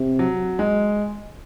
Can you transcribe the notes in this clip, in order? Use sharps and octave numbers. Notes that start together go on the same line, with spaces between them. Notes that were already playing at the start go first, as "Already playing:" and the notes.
Already playing: C3
F#3
G#3